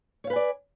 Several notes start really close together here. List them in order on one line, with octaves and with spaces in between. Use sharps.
C#5 F5 B4 G#5 D5